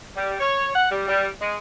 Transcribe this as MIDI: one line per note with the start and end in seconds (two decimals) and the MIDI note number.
0.16 0.36 55
0.40 0.70 73
0.75 0.89 78
0.90 1.05 55
1.08 1.28 55
1.41 1.56 56